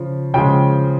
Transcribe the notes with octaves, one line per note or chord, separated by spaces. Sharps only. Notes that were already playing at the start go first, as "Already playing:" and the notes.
Already playing: C#3 F3
C#3 F3 G#3 G5